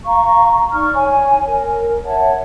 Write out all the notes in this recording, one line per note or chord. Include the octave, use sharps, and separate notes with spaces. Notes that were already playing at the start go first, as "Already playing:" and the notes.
F5 A#5 C#6
D#4 D5 C#6 F6
C#5 G#5
A#4
C#5 E5 F#5 A5